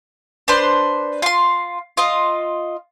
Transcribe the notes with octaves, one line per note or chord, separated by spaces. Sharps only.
D4 B4 C5
F4 C6
F4 D#5